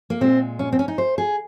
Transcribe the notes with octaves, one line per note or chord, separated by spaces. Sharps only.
A#3
A#2 G#3 C4
C#4
C4
C#4
D#4
C5
G#4